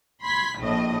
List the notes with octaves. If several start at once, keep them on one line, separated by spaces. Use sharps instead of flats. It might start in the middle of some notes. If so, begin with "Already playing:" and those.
B5 C6 G#6 B6
A#1 A2 D#5